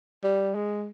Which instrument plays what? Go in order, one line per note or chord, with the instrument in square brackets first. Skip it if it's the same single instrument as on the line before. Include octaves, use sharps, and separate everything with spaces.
[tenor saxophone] G3
G#3